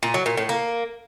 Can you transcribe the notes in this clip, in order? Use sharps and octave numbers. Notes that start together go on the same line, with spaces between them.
A#2
F#3
A#2
A2
A#3